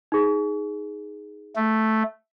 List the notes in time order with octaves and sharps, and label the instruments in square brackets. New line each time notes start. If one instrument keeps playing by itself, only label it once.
[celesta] D#4 G#4
[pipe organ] A3